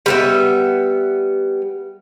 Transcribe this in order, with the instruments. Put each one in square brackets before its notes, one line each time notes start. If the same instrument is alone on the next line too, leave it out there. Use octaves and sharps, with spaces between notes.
[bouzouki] G3 B3 E5